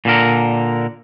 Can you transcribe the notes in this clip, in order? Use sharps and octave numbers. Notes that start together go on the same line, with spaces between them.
A#2 D3 A#4